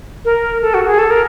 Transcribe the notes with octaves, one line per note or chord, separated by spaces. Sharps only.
A#4
A4
F#4
G#4
A4
A#4